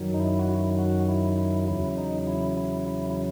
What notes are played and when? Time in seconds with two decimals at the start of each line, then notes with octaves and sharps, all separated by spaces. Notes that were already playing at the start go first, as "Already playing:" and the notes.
Already playing: F#2 D#3 F#3
0.14 D#4
0.20 E4
0.39 F#4
0.48 E4
0.79 F#4
1.08 E4
1.38 E4
1.68 E2 C#3 F#3 E4
1.98 D#4
2.27 E4
2.57 E4
2.87 E4
3.10 E4